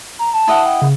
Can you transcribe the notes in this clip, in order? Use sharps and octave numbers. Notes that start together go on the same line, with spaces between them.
A#5
A5
E4 D#5 F#5
G5
C#3